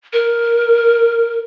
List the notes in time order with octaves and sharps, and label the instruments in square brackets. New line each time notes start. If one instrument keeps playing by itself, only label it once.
[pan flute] A#4